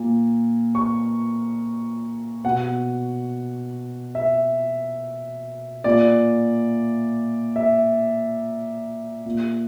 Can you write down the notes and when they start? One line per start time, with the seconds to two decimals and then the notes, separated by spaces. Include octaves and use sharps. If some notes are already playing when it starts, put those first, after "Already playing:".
Already playing: A#2
0.75 C#6
2.44 B2 F#5
4.15 E5
5.84 A#2 D5
7.56 E5
9.26 A#2